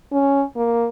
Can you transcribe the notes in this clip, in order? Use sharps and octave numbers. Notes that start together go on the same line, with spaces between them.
C#4
A#3